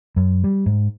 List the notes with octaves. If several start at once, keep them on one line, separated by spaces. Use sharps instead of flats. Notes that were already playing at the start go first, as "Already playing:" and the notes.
F#2
G3
G#2